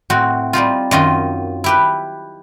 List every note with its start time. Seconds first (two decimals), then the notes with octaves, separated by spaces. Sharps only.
0.10 A2 C4 F#4
0.53 G3 C4 D#4 F4
0.91 F#2 D#3 F4 D#5
1.64 E4 G4 B4